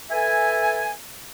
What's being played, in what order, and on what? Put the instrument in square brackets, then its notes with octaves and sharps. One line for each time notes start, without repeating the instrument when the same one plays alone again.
[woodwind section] A4 B4 E5 G#5